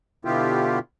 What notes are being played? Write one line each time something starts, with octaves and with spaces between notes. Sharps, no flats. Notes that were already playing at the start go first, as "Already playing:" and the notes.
B2 D3 B3 E4 F4 G4